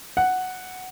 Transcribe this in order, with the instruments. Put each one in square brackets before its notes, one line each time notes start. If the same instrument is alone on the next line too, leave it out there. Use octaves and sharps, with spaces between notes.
[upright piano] F#5